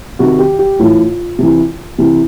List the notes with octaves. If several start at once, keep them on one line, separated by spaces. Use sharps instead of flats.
C3 D#3 F#4
G4
G4
A2 E3 F4
C3 E3
C3 E3